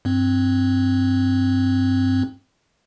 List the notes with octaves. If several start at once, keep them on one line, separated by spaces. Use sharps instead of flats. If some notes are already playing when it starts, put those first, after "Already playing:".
G2 C4